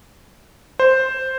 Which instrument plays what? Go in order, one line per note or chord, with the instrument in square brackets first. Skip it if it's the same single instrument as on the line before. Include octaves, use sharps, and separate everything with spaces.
[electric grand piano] C5